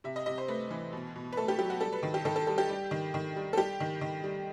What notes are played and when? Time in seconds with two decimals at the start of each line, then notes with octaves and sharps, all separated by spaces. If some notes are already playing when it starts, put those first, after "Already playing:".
0.04 C3 E5
0.16 D#5
0.26 C3 D#5
0.38 C5
0.48 A3 B4
0.70 E3
0.93 B2
1.16 B2
1.32 B4
1.37 A3 A4
1.48 G4
1.59 F#3 G4
1.70 F#4
1.81 G3 A4
1.93 B4
2.03 D#3
2.14 G4
2.25 D#3 A4
2.36 A4
2.47 G3 A4
2.58 G4
2.69 G3
2.91 D#3
3.14 D#3
3.36 G3
3.53 A4
3.57 G3 G4
3.80 D#3
4.01 D#3
4.24 G3